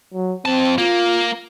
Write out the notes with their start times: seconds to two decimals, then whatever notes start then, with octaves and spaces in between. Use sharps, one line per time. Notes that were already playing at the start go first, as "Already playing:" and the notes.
0.14 F#3
0.45 F2 C4 A5
0.78 A#3 F4